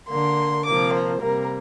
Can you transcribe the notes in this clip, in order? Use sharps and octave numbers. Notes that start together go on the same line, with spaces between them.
D3 A#3 C6
C3 F3 A#3 D6
C5
C3 G3 A#3 A#4